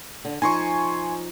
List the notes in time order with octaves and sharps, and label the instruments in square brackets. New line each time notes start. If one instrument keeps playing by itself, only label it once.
[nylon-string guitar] D3
[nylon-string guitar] F3 D#4 [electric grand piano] G#5 C6 C#6